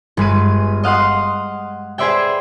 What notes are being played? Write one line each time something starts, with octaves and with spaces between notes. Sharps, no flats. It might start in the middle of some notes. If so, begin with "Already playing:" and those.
G1 G#3 B4 D#7
D#5 F5 F#5 C6 D#6
G#4 B4 C5 D5 E5 G5